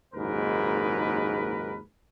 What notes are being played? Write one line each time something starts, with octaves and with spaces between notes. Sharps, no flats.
F#1 D#2 G#2 A#4 B4